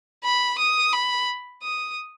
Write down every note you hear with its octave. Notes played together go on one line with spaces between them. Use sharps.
B5
D#6
B5
D#6